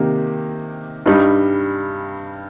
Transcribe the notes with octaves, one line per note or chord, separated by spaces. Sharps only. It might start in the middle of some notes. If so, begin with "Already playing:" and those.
Already playing: C3 D#3 A#3 G4
G2 G3 D#4